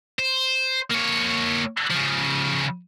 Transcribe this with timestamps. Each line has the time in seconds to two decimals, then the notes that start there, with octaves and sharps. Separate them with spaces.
0.19 C5
0.91 A#3 C#5
1.91 C#3 F3